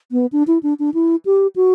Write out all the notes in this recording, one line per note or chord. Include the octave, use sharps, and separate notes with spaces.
B3
D4
E4
D4
D4
E4
G4
F#4